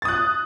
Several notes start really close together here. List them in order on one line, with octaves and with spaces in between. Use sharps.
A6 D#6 F#6